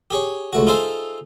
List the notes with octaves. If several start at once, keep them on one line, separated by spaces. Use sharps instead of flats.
G4 G#4 C#5
C#2 A3 F#4
D#4 F4 G#4 A4 C5 E5